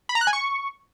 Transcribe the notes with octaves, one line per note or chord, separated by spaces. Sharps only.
B5
A#5
F#6
G#5
C#6